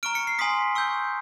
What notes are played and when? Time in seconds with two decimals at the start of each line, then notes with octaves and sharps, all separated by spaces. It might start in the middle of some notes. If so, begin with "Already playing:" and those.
0.03 A#5 C#6 F6 D7
0.15 C#7
0.27 C7
0.39 G#5 C6 D#6 B6
0.75 C#6 E6 G6